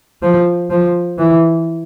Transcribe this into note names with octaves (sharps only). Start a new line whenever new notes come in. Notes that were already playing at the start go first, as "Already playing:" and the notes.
F3
F3
E3